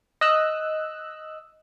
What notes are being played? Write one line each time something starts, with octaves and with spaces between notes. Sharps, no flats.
D#5 E6 F#6